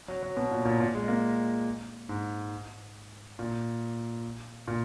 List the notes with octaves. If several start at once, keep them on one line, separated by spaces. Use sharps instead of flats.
F#3
F#3
B2
A#2
A#2
A#2
G#3
A#3
G#2
A#2
A#2